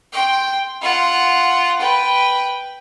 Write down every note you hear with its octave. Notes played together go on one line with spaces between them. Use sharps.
G5 C6
F4 F#5
B4 G5